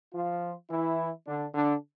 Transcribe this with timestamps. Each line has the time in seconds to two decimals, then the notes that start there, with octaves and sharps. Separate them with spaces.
0.13 F3 F4
0.69 E3 E4
1.26 D3 D4
1.54 D3 D4